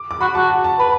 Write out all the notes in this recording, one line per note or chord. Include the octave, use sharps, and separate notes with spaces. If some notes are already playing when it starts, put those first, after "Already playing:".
Already playing: D6
D6
F#4 B5
F#4 A5
F#5
A5
B4 B5